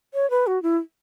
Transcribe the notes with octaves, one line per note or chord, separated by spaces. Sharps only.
C#5
B4
F#4
E4